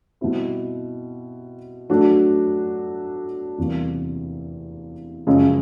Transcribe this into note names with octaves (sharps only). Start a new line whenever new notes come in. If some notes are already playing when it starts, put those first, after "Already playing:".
B2 G3 C4 E4
F#3 A3 D4 F#4
E2 C3 E3 G3 A#3
F#2 C#3 F3 G#3